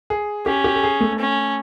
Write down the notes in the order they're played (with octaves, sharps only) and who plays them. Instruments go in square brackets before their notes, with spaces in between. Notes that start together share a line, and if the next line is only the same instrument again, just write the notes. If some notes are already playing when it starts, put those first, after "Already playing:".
[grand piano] G#4
[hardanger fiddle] C#4 [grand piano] G4
[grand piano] G4
A4
G#4
A3 A4
[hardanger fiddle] C#4